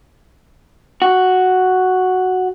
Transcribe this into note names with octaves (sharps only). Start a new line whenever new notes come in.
F#4